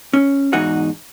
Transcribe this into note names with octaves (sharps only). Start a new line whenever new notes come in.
C#4
E2 G#2 D#4 F#4 F#5